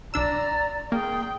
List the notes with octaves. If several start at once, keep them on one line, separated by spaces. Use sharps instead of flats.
B1 D4 D5 A#5 E6
A#3 G#4 G5